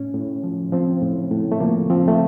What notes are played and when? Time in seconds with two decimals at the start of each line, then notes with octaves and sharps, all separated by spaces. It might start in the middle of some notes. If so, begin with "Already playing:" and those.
Already playing: A2 C#4
0.14 A2
0.44 F3
0.72 F3 C4
1.02 A2
1.31 A2
1.52 A3
1.60 F3 A#3
1.90 F3 C4
2.08 A3